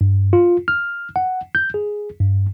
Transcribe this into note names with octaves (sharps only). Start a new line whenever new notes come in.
G2
F4
F6
F#5
G6
G#4
G2